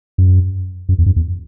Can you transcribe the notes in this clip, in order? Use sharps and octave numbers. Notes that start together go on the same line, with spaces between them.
F#2
F#2
E2
F#2
E2